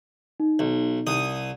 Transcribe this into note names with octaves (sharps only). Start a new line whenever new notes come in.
D#4
B1
C2 D#6